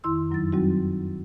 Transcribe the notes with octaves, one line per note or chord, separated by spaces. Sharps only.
F2 D#3 E4 C6 E6
F#2 F#3 D#4 A6
F#3 G3 C4 D#4 F#4